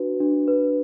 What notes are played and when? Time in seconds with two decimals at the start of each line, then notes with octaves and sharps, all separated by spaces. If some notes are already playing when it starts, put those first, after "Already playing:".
Already playing: D4 F#4 B4
0.20 D4
0.48 B4